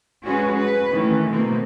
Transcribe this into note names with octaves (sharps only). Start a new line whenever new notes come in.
G#3 C#4 F#4 G#4 B4
B4
D#3 E3 A3 C#4
B2 A3 A#3 C4